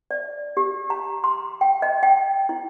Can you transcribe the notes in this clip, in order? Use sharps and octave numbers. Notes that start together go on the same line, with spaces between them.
D5
G4
A#5
C6
G5
D#5
G5
E4